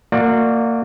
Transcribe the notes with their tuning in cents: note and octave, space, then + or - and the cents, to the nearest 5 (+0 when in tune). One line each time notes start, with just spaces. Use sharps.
A#3 -25 F#4 -35 D5 +15